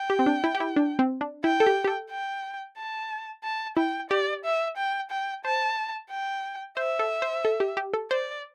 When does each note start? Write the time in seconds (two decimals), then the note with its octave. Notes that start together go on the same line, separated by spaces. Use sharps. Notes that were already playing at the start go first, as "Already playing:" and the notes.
Already playing: G5
0.10 G4
0.19 C4
0.26 D4
0.44 E4
0.55 G4
0.60 E4
0.76 D4
0.99 C4
1.21 D4
1.44 E4 G5
1.60 A4
1.67 G4
1.84 G4
1.88 A4
2.10 G5
2.78 A5
3.44 A5
3.77 E4 G5
4.10 G4 D5
4.44 E5
4.77 G5
5.11 G5
5.44 C5 A5
6.10 G5
6.77 C5 E5
6.99 A4
7.22 C5
7.45 A4
7.60 G4
7.77 G4
7.94 A4
8.11 C5 D5